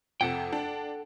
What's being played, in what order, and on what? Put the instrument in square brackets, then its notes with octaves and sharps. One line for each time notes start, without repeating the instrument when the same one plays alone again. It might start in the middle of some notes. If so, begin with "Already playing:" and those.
[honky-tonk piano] F2 C3 [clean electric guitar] A4 F#5 G5
[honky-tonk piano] D4